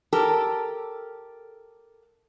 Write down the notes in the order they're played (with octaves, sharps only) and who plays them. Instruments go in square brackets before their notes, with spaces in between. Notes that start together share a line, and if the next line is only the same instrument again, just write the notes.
[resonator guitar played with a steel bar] G4 A4 A#4